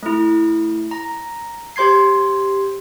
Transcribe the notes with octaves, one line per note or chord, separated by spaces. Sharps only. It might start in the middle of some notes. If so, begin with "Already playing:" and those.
A3 E4
A#5
G4 C5 C6 G#6 C7